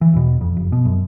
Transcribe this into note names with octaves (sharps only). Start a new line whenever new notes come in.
E3
E1 B2
F2
F#1
B2
F#2